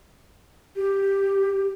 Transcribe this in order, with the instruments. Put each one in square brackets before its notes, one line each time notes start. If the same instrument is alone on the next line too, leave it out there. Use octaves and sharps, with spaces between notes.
[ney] G4